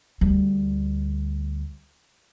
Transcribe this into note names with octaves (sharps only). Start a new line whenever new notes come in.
D2 G3